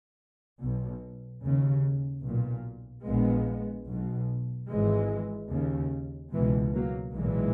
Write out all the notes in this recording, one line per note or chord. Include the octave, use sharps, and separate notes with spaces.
B1 B2
D#2 C#3
B1 A#2
A#1 A#2 G#3 B3
B1 B2
G#1 G#2 E3 G#3
D#2 C#3
C#2 B2 E3 G#3
F#3 A#3
B1 A#2 E3 G#3